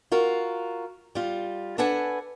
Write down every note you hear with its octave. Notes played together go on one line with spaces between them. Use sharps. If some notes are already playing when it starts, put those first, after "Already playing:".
F4 F#4 A#4
G3 F4
D4 A4 B4 F#5 G#5